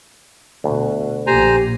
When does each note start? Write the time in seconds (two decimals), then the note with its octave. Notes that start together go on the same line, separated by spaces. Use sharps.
0.64 D2 B2
1.27 A#1 A#2 G4 C5 G#5 A#5